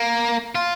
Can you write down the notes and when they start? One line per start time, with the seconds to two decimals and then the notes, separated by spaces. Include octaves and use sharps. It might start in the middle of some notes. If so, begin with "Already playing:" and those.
Already playing: A#3
0.55 F4